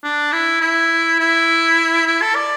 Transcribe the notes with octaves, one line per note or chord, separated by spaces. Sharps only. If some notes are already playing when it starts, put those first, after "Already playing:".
D4
E4
E4
E4
E4
A4
D5